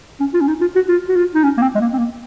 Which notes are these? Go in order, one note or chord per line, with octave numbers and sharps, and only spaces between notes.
C#4
F4
C#4
D#4
F4
F#4
F4
F#4
F4
D#4
C#4
A#3
C4
G#3
A#3
C4
A#3